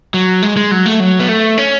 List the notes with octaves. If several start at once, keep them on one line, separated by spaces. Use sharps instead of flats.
F#3
G#3
G#3
F#3
A3
F#3
B3
A3
C#4